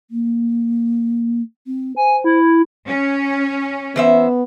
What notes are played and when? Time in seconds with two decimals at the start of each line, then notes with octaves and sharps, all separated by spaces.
0.11 A#3
1.67 C4
1.96 C5 G#5
2.24 E4
2.87 C#4
3.96 E3 B3 C5 E5